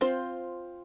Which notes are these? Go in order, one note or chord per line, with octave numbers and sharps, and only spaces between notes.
C4 F4 C5